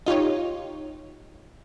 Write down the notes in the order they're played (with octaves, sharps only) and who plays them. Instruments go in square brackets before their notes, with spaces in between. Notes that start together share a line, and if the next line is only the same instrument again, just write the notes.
[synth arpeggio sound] D#4 F4 G4 C#5